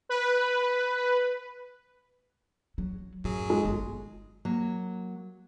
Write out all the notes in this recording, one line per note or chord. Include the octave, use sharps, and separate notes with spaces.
B4
F#3
F#2 A2 F#3 G#4
G#3
G1
F#3 A#3